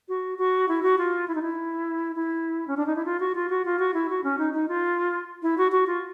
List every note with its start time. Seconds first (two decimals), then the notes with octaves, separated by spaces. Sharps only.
0.08 F#4
0.38 F#4
0.68 E4
0.83 F#4
0.98 F4
1.28 E4
1.35 D#4
1.42 E4
2.16 E4
2.67 C#4
2.77 D4
2.86 D#4
2.96 E4
3.05 F4
3.20 F#4
3.35 F4
3.49 F#4
3.65 F4
3.79 F#4
3.94 E4
4.09 F#4
4.24 C#4
4.38 D#4
4.53 D#4
4.68 F4
5.42 E4
5.58 F#4
5.72 F#4
5.87 F4